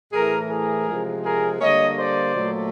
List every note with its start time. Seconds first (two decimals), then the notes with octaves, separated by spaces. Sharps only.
0.12 A2 E3 A3 G#4 A#4
0.50 G#4 A#4
0.87 C3 F3 G#3
1.24 G#4 A#4
1.61 D3 G3 A#3 C#5 D#5
1.98 C5 D5
2.35 A#2 F#3 A3